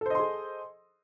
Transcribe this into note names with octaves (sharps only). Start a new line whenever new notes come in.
G#4 A4 C5 D#5 C6